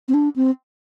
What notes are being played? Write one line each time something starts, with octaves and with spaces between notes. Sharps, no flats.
C4
D4
C4